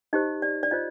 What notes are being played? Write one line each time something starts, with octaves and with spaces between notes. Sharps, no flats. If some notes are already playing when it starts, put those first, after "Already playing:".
D#4 G4 C5 D#5
D5
D5
F4 C5 D#5